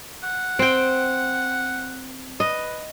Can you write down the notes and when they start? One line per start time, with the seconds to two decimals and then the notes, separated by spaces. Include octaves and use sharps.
0.23 F#5
0.59 C4 G5
2.40 B4 D#5